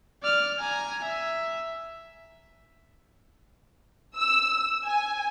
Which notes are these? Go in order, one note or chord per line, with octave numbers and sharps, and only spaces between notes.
D5 F6
G#5 A#5
E5
E6
G#5